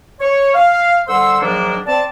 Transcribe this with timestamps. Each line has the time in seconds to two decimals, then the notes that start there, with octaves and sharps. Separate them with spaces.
0.20 C#5
0.54 F5
1.07 D3 G3 C5 F#5 C6 E6
1.41 G#2 D#3 F3 F#3 A#3 D4
1.86 C4 D5 A5